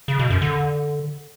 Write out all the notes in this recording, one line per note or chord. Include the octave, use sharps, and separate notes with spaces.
C#3
B2
F#2
D3